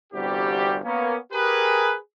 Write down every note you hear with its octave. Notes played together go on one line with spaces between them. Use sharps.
G1 E2 C3 G3 F#4 G4
A#3 B3 C#4
G4 G#4 A#4 B4